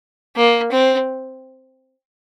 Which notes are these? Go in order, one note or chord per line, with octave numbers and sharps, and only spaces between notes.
A#3
C4